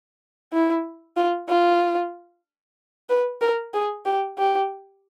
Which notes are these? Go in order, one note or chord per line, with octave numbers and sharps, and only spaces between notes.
E4
F4
F4
B4
A#4
G#4
G4
G4